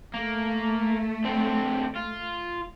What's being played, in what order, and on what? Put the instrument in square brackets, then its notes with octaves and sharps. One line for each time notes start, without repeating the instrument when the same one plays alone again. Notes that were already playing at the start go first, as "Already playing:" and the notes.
[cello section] A3 [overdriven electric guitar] A#3
[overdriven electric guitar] D3 C4
F4